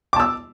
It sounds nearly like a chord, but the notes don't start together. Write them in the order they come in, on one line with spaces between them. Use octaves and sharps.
D6 A5 E6